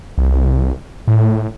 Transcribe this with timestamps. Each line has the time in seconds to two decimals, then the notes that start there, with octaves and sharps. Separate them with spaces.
0.18 C2
1.08 A2